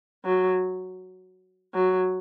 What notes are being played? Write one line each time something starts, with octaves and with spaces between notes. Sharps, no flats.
F#3
F#3